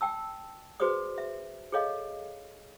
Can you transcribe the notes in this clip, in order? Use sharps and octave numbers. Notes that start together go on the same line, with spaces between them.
G5 A5 E6
F#4 G#4 B4 C5 D5 D#6
E5
G#4 A4 C#5 D#5 F5